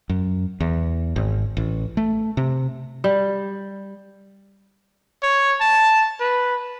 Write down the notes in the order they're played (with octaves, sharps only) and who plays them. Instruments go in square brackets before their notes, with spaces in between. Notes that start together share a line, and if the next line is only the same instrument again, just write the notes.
[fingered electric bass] F#2
E2
G#1
A1
A3
C3
[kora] G3
[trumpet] C#5
A5
B4